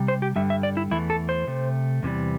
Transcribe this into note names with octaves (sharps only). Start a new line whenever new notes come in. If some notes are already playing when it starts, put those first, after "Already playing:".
Already playing: C3 G3
C5
G4
G2 D3 G3 E5
E5
D5
E4
E2 E3 A3 E4
A4
C5
C3 A3
E2 C3 E3 G3